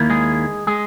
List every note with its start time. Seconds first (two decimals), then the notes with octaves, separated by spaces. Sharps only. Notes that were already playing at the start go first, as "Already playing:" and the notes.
Already playing: D#2 D#3 A#3 E4
0.10 G#3 G#4
0.67 G#3 G#4